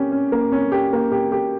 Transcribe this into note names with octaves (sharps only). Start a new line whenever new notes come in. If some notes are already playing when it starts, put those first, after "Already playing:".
Already playing: A#3 C#4 G4
C#4
A#3
C#4
G4
A#3
G4
G4